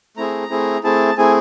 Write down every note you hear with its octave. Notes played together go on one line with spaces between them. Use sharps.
A3 C4 E4 G#4 A#5
A3 C4 E4 G#4
A3 C4 E4 G#4 A5
A3 C4 E4 G#4 G#5